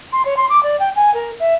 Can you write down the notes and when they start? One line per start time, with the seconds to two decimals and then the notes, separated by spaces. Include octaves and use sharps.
0.13 C6
0.25 C#5
0.37 C6
0.50 D6
0.63 D5
0.80 G5
0.96 G#5
1.14 A#4
1.40 E5